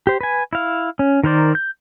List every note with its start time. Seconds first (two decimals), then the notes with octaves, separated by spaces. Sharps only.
0.07 G4 C5
0.21 B4 G#5
0.53 E4 F5
0.99 C#4
1.24 D#3 A#4 C5 D5
1.55 G6